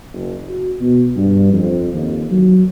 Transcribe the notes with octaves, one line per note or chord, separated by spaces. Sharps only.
F#1
F#4
B2
G2
F2
D#2
F#3